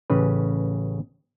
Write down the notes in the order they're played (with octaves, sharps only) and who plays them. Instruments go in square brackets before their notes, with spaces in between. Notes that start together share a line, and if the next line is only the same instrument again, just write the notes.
[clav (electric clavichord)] A1 C#3 B4